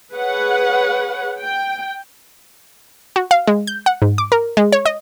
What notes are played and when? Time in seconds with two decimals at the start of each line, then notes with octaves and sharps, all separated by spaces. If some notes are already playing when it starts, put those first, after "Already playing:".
0.13 G#4 B4 C#5 F#5
1.41 G5
3.16 F#4
3.31 F5
3.47 G#3
3.67 G6
3.86 F#5
4.02 G#2
4.18 D6
4.32 A#4
4.57 G#3
4.72 C#5
4.86 D#5